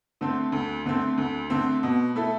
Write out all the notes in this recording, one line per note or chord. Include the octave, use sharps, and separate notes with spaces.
D3 A3 C4
D2
D3 A3 C4
D2
D3 A3 C4
B2
A3 E4 A4